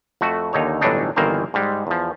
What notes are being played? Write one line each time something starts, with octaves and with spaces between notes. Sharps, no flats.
F2 A3 F#4
D#2 D3 D#4 C#5
G1 A2 E3 F#3 D4 D#4
G1 D#3 E3 A#3 A#4 C5
G#2 G3 G#3
E2 F3